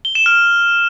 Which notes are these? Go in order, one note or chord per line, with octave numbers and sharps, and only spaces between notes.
G7
E7
F6